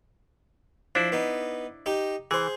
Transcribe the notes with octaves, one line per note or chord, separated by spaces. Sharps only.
F3 D4 E4 C5
B3 D#4
D#4 G4
E3 G#4 C5